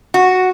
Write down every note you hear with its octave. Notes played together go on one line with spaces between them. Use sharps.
F#4